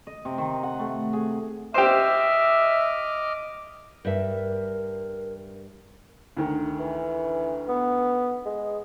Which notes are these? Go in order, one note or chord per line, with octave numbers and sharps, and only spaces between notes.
D#5
C3
D#3
F#5
A3
G#4
G4 C5 D#5 E5 D6 F6
G2 A#4 E5
D2 D#3
E3
B3
G#3